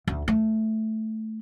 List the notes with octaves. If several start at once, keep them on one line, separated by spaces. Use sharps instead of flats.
D2
A3